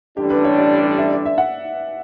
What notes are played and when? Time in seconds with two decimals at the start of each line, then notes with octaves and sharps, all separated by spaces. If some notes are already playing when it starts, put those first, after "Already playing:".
0.17 A1 G2 D3 G3 D4 G4
0.30 B4
0.44 C#5
0.58 D5
0.98 E5
1.11 D5
1.26 E5
1.38 F#5